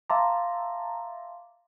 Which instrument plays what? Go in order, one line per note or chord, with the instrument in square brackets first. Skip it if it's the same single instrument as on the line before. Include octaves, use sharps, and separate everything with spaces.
[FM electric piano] E5 A5 A#5 [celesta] F5 C6 D6